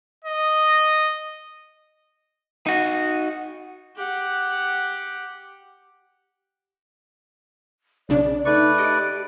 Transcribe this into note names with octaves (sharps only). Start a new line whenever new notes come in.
D#5
D#4 F#4
G4 F#5
B1 C#3 D4 D5
A3 D#4 B4 D5 C#6
G4 D#5 C#7 D7